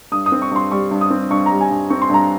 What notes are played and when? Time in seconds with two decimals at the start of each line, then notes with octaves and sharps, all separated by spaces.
0.12 G2 D#6
0.26 D#6
0.32 C4
0.42 C#6
0.52 G2 C6
0.71 G3 C#6
0.91 G2
1.01 D#6
1.10 C4
1.31 G2 C#6
1.46 A#5
1.51 G3
1.61 G#5
1.71 G2
1.90 C4 C#6
2.02 C6
2.10 G2 A#5